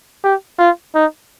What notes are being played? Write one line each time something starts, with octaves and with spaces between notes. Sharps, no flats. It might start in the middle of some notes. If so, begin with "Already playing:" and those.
G4
F4
D#4